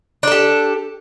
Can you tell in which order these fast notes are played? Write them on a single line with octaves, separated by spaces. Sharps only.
D4 A4 G4